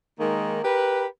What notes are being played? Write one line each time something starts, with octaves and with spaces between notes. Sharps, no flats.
D#3 G#3 A#3 D#4
G4 A#4 B4